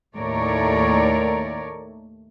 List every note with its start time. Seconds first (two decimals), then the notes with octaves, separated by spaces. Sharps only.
0.15 D#2 A2 A3 A#4 C#5 D5